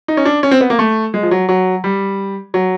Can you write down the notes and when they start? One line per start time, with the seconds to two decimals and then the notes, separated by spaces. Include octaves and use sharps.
0.08 D#4
0.17 C#4
0.25 D4
0.43 C#4
0.51 C4
0.61 B3
0.70 A#3
0.79 A3
1.14 G#3
1.23 F3
1.31 F#3
1.49 F#3
1.84 G3
2.54 F#3